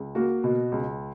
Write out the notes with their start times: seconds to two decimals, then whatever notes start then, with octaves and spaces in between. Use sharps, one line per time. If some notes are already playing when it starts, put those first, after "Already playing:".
Already playing: C#2
0.15 A#3 F#4
0.44 B2
0.72 C#2